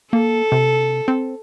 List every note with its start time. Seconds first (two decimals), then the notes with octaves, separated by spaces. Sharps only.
0.13 A#3 A4
0.52 C3
1.08 C4